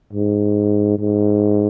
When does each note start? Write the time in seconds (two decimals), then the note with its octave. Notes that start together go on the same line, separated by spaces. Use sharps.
0.13 G#2
0.98 G#2